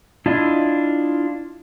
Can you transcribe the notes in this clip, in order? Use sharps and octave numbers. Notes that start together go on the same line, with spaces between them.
D4 E4 F4 D#5